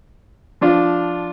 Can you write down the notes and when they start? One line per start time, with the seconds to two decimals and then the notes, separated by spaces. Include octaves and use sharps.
0.61 F3 D4 F4